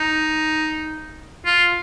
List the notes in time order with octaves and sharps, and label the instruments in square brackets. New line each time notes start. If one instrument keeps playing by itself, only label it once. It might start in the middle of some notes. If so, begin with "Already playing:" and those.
Already playing: [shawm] D#4
F4